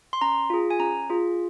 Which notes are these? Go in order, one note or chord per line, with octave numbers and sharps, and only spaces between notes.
C6
C#4 A#5
F4 G#4
G#5
C#4 A#5
F4 G#4